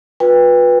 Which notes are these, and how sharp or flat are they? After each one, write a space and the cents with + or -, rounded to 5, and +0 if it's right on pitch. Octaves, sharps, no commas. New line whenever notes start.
F4 +40 B4 -10 G5 +30